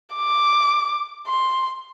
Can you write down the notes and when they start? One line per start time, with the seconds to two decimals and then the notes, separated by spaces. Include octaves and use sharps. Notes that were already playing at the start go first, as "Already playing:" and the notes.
0.16 D6
1.27 C6